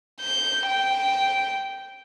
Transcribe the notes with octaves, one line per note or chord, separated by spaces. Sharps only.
G6
G5